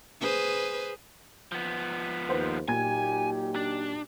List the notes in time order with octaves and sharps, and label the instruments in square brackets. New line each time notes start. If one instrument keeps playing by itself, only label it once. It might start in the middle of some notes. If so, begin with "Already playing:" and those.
[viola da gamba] G#4 B4 C5
[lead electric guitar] F3 B3
[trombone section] D#2 [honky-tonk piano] B4 C5
[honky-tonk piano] A#2 G#6 [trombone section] F#3 D#4 G4 [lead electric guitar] G#5
[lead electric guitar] D4